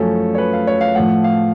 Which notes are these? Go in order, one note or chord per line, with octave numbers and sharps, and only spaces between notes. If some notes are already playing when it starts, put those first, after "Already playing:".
Already playing: F#2 F3 A3 C#4 A4
C#5
B4
F5
C#5
F5
A2 F3 A3 F#5
F5